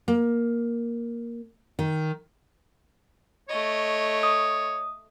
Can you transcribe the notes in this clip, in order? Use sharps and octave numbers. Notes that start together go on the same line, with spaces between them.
A#3
D#3
A3 C#5 D#5
D#6